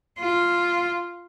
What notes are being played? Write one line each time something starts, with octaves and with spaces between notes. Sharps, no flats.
F4